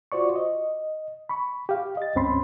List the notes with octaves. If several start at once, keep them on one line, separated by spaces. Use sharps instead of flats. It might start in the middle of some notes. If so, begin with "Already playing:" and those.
F4 F#4 C5 D5 C#6
D#5
B5 C#6
G4 F5
D#5 A6
C#2 G2 C4 C#4 B5 C6